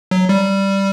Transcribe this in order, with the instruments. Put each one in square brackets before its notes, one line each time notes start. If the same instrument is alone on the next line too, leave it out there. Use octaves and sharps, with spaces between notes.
[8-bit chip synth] F#3
G3